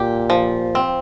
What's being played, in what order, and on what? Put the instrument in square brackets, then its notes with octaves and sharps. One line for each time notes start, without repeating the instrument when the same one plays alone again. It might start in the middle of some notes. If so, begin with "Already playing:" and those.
Already playing: [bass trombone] A#2 [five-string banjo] G4
[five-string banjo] F3
C4